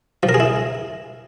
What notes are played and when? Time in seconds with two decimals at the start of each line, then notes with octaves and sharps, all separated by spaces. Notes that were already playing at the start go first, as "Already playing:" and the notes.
0.23 F3
0.29 A#4
0.34 G#4
0.40 E4